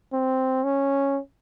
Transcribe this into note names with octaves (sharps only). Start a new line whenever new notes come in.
C4
C#4